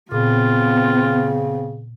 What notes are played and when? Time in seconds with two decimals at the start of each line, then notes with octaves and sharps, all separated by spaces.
0.12 A#2 C#3 B3 C4 F4